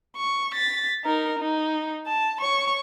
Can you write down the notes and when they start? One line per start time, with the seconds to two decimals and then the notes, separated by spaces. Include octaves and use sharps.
0.17 C#6
0.54 A6 B6
1.05 D#4 A#4
1.39 D#4
2.07 A5
2.40 C#5 C#6